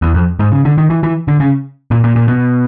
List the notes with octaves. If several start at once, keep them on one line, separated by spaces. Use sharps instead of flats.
E2
F2
G#2
C#3
D3
D#3
E3
E3
D3
C#3
A#2
A#2
A#2
B2